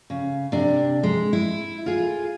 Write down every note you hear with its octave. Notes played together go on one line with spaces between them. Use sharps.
C#3
C3 D4
G#3
E4
F4 G#4